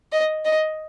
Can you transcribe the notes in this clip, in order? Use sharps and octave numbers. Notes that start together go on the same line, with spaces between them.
D#5
D#5